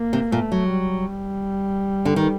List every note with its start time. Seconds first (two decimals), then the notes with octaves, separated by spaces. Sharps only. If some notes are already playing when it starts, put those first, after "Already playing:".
Already playing: A#3
0.13 C3
0.32 A#2 A3
0.52 F#3
0.71 G3
2.05 D3
2.16 D#3